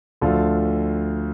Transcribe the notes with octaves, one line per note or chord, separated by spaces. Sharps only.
D2 D3 F3 A3 F4 A4